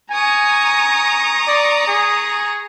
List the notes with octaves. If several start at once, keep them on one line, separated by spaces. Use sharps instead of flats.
G#5 A#5 C#6 D#6
D5
G#4